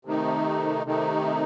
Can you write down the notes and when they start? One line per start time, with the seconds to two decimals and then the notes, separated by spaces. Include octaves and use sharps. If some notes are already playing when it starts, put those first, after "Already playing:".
0.05 C3 D#3 A3 D#4
0.84 C3 D#3 A3 D#4